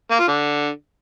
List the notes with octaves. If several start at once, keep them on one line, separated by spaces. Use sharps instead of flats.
A#3
F4
D3